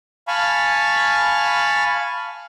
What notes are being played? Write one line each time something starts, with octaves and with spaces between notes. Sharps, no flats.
F5 G#5 A5 B5 C#6